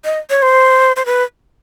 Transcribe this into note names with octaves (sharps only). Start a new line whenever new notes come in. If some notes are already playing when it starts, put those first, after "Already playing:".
D#5
C#5
C5
C5
B4